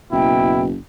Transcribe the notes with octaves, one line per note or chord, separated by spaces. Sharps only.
F#1 B2 E4 G5